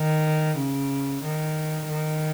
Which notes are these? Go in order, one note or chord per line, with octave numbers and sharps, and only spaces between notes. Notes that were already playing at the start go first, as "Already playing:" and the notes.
Already playing: D#3
C#3
D#3
D#3